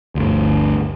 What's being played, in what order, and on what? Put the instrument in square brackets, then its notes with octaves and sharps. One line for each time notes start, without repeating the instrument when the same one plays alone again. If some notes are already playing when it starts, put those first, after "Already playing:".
[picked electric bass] G1 D2